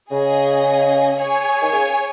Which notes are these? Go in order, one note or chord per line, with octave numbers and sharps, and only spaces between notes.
C#3 C#4 G#4 D#5
G#4 C#5 G#5
D#3
C#3